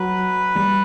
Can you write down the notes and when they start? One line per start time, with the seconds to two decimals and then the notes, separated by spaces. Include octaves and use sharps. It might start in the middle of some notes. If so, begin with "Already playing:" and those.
Already playing: F#3 B4
0.55 G3